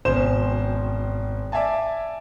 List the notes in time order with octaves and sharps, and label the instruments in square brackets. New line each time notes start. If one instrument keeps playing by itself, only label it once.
[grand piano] G#1 B2 C#4 C5 E7
D5 E5 F5 G#5 A5